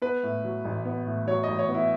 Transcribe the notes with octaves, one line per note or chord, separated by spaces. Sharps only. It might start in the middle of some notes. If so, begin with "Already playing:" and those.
B3 B4
A2
F#3
A1
B3
A2
F#3 C#5
A1 D#5
C#5
B3
E4